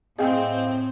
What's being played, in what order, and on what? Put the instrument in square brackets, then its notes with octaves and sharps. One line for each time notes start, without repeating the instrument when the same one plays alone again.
[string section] A2 C4 [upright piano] G#4 [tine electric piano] D#5 F5 G5